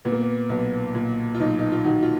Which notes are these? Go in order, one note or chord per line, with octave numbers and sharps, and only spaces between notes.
A#2 B3
A#3
B3
B1 B3
A#2
F4
B1 D#4
D#4
F4
D#3 F#4
F4